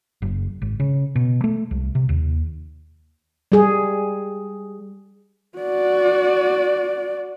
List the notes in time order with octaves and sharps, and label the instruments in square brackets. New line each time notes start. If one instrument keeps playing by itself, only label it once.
[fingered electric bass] F#1
G#1
C#3
B2
A3
C2
C3
D#2
[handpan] G3 G#4
[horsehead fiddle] F#4 D5